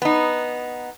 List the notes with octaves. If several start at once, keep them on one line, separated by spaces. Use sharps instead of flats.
B3 D#4